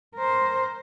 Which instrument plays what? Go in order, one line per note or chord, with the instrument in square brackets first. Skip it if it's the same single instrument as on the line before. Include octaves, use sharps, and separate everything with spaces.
[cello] A#4 C5